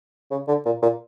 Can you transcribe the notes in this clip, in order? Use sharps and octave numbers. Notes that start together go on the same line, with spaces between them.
C#3
D3
A#2
A#2